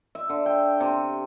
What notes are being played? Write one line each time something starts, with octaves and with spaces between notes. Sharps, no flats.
E5
D3
G5
C3